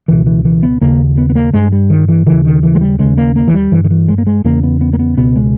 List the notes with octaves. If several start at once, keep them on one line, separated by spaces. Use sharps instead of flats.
C#2 B2 E3
E3
E3
B3
D#2 C#3 A#3
B3
B3
A#3
G2 G#3
G3
D#3
E3
D#2 C#3 E3
D#3
E3
G#3
G3
D#2 C#3 G#3
A#3
A#3
E3
G3
G2 E3
D#3
E3
G#3
A#3
G#3
E2 C#3 A#3
B3
B3
A#3
B3
C#2 B2 B3
G#3